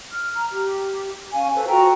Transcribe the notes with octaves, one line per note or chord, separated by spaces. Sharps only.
F6
A#5 F6
G4
C#4 F5 G#5
A4 B4 C5
F4 F#4 G5 A#5